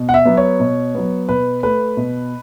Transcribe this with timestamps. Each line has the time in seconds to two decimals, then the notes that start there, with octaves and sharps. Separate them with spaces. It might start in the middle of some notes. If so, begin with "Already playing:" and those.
Already playing: B2
0.09 F#5
0.14 E5
0.25 F#3 B3
0.37 C#5
0.60 B2
0.95 F#3 B3
1.29 B2 B4
1.63 A3 B4
1.97 B2